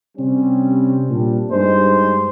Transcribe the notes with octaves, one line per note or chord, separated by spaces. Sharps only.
C3 G3 C4 C#4
A#2 G3 D4
G2 G#3 D#4 C5